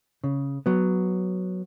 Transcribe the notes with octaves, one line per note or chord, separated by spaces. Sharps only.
C#3
F#3 B3